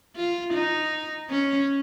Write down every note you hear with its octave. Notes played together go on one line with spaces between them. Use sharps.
F4
D#4
C#4